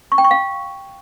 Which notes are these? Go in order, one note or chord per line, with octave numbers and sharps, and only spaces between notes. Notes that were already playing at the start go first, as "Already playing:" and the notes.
C#6
G5
C#6
F5